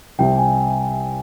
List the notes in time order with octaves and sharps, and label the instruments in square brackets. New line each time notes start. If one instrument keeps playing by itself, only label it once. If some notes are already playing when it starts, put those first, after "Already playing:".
[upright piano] C2 C3 G3 [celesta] G5
[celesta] G#5